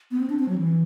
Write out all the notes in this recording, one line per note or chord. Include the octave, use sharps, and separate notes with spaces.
B3
C4
D4
C4
F#3
E3